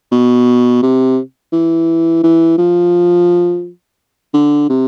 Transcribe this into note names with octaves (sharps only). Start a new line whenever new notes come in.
B2
C3
E3
E3
F3
D3
C3